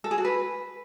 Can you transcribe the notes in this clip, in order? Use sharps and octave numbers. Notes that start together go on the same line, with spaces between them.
A4
G#4
F#4
B4